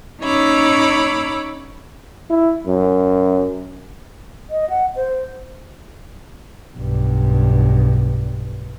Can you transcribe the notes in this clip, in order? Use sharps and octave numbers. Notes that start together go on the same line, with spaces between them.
C#4 D#4 C#5 B5 D6 E6
E4
F#2
D#5
F#5
C5
B1 G2